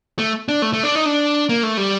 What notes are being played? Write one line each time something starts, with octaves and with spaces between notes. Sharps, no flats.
A3
D4
A3
A3
D4
D#4
D4
A#3
A3
G3